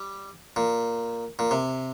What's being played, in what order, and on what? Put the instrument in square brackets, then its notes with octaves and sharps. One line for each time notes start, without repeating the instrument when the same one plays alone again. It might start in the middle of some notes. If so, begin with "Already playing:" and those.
Already playing: [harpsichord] G3
A#2
A#2
C3